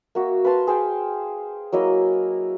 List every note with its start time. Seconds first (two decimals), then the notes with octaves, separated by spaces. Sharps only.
0.15 A#3 F#4 E5
0.44 B4 F5 A5 C6
0.67 G#4 C5 F5 G5
1.72 F#3 A#3 E4 D#5